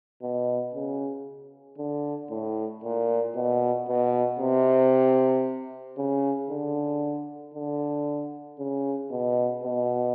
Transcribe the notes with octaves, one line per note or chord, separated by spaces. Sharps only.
B2
C#3
D3
A2
A#2
B2
B2
C3
C#3
D3
D3
C#3
B2
B2